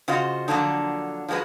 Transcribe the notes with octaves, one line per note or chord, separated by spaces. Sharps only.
C#3 F4 F#4 C5 D#5
D3 F3 F#3 A#3 D4 D#4
F3 F#3 G#3 F#4 B4